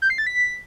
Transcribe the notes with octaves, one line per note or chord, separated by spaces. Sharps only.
G6
C7
A6
B6